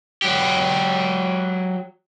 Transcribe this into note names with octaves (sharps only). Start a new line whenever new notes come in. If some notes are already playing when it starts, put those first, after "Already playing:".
F#3 G4